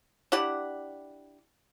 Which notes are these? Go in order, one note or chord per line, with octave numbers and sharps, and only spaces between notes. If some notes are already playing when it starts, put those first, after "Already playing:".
D4 E4 G4 F#5